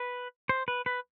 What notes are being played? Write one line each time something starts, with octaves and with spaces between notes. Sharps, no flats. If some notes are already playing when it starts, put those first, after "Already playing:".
Already playing: B4
C5
B4
B4